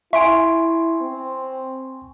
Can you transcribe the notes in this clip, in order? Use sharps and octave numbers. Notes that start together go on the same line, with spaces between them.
E4 E5 G#5 C6 C#6 D7
C4